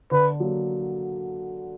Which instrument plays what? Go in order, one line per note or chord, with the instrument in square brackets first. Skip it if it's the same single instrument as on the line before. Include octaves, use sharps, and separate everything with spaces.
[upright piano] D3 [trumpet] B4
[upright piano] F#3 A#3